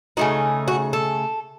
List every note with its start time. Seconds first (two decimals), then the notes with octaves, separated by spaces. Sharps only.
0.17 C#3 A3 D#4 F#4
0.68 F#4
0.93 A4